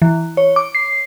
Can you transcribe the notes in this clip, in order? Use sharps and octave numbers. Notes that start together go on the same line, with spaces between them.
E3
C#5
D6
C7